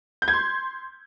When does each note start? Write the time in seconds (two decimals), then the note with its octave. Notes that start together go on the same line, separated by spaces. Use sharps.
0.22 G6
0.28 G#6
0.33 C6